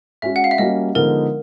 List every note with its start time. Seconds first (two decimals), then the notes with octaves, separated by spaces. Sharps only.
0.22 G#3 C#4 F#4 E5
0.36 F#5
0.44 F5
0.51 E5
0.58 G3 A#3 C#4 F#4 D#5
0.95 D3 F3 G#3 B3 D#4 A#4